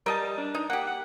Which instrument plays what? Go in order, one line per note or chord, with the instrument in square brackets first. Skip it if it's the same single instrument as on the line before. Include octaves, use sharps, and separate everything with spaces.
[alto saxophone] G3 [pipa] A#4 D#5 A5
[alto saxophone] D4
[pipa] D#4
[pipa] A#3 G4 [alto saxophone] F#5
[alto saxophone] F#5